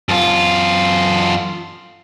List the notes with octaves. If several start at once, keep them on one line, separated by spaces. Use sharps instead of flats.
F#2 F4